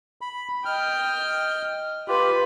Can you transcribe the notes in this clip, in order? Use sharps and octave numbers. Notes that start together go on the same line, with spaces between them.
B5
D#5 G5 F6
F4 G4 B4